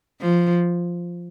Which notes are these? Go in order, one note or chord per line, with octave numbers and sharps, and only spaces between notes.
F3